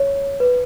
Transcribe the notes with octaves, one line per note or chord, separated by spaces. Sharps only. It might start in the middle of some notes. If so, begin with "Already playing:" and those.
Already playing: C#5
B4